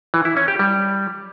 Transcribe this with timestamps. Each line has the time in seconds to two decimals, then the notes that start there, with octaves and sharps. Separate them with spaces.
0.14 E3
0.25 E4
0.37 C#4
0.48 G4
0.59 G3